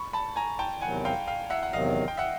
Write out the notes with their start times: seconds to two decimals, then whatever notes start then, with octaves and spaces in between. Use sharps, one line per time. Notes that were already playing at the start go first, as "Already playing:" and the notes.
Already playing: B5 C#6
0.13 A5 B5
0.36 G#5 A#5
0.59 G5 A5
0.81 E2 C3 D#3 F#3 F#5 G#5
1.05 F5 G5
1.27 F5 G5
1.50 E5 F#5
1.63 F#5
1.73 E2 C3 D#3 F#3 D#5 F5
2.08 G5
2.17 E5 F#5